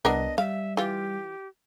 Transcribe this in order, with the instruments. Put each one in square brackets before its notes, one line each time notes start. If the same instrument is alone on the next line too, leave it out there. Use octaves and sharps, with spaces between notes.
[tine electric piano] C2 [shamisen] B3 D4 A#4 [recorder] D#5
[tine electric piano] G3 [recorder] E5 [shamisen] F5
[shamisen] E3 F4 [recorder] G4